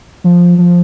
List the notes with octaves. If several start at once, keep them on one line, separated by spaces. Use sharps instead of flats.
F3
F3